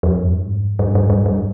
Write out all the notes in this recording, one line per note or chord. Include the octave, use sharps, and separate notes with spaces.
F2
G2
G#2
G2
G2
G2
G2
G2